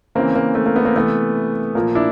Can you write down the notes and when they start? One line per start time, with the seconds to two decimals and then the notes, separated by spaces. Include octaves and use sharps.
0.15 C#3 E3 A#3 C4
0.35 A#3
0.55 A3
0.66 A#3
0.76 A3 B3
0.85 A#3 C4
0.96 C3 E3 A3 B3
1.75 A#2 F3 A#3
1.95 D4 E4